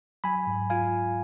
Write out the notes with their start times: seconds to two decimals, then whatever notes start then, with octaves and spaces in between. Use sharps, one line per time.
0.24 F#3 G#5 B5
0.47 G#2
0.70 F4 F5 G#5